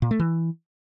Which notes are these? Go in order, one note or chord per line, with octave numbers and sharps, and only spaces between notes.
A#2
A3
E3